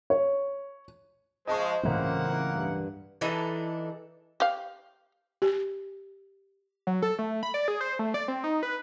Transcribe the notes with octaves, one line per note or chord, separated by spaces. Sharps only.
C#5
F3 G#3 C5 D#5 A5 C#6
C#2 A2 C#3 E3 F#3 A#3 C4 F#5
G2
E3 D4 D#4 A4
G4 F5
G4
F#3
A4
A3
B5
D5
G#4
C5
A3
D5
C4
D#4
B4